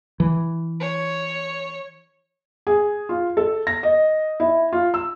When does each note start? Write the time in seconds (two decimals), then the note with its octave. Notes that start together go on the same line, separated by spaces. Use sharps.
0.20 E3
0.80 C#5
2.67 G#4
3.09 F4
3.37 A4
3.67 A#6
3.83 D#5
4.40 E4
4.73 F4
4.94 E6